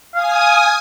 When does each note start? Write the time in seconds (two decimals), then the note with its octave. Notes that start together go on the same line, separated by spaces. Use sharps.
0.15 F5 G#5 D#6